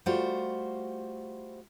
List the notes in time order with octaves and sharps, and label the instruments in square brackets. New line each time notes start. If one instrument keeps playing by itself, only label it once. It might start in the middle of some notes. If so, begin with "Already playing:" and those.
[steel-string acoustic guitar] G3 A3 F4 F#4 C5